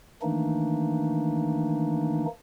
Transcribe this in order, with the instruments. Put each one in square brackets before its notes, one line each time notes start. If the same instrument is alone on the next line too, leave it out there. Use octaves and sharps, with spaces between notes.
[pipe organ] D#3 E3 A3 A#3 D4 D#4